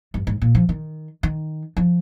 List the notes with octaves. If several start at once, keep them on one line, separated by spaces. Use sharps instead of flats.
G2
G#2
A#2
F3
D#3
D#3
F3